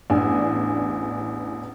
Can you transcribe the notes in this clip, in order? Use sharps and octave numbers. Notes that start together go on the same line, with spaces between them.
A1 E2 D4 G#5